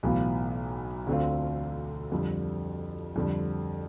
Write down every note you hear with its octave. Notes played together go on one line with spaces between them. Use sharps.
B1 A2 E3 B3 F4
D2 D3 A3 C4 F4
F2 D3 G3
F2 D3 G3